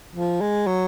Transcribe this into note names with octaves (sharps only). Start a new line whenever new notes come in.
F3
G#3
F#3